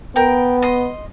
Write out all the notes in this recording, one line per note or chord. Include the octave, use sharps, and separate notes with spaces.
B3 A#4 G5
D#5 C6